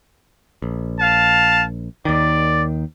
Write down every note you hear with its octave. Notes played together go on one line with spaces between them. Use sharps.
A#1
F5 A5
D#2 D#3 D5